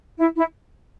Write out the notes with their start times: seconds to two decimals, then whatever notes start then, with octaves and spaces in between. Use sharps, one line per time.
0.18 E4
0.36 E4